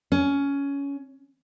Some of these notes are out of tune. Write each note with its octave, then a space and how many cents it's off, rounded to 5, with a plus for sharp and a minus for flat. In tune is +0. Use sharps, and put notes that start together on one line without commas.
C#4 +15